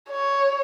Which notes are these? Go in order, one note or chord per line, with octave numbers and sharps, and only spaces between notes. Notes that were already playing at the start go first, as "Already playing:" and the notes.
C#5